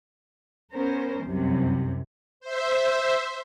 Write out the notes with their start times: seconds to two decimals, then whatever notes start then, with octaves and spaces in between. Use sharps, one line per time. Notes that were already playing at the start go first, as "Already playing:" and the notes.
0.74 B3 C#4 A#4 C5
1.24 C2 F#2 C3
2.40 C5 E5